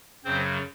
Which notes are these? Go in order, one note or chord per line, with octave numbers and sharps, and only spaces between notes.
F#2 C#3 F#3 C4 C5